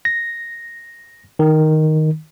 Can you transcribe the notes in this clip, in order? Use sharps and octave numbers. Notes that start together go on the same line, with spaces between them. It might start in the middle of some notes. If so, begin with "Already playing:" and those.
A#6
D#3